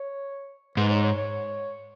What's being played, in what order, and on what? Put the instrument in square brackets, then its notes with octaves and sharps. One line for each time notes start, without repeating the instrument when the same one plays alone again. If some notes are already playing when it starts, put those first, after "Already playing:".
Already playing: [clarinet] C#5
[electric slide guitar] G#2 [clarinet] B4
[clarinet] C#5
C#5
C#5